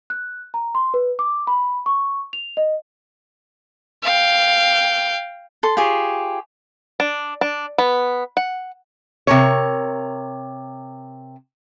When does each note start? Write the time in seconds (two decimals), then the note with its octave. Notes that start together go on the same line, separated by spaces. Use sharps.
0.10 F#6
0.54 A#5
0.75 C6
0.94 B4
1.19 D6
1.47 B5
1.86 C#6
2.33 F7
2.57 D#5
4.04 F5 G5
5.63 A4 C6
5.77 F4 G4 G#4 C#5
7.00 D4
7.41 D4
7.78 B3
8.37 F#5
9.27 C3 A#4 C#5